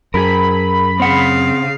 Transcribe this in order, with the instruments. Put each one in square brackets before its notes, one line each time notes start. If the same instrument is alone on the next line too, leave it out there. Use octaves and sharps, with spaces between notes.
[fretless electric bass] F#2 [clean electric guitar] G#4 A#4 [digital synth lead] B5
[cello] C#3 F5 [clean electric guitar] C4 F#5